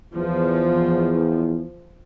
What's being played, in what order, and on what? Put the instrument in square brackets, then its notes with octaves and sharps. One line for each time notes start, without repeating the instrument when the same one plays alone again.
[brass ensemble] E2 [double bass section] F3